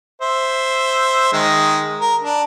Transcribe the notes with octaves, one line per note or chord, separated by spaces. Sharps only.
C5 E5
D#3 G#3
A#4
D4